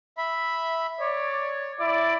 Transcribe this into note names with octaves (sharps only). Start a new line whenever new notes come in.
E5 B5
C#5 D5
E4 D5